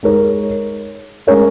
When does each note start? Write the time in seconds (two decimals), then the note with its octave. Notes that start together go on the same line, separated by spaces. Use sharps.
0.03 G#3 D#4 A#4 C#5
1.27 G#3 C#4 A#4 C#5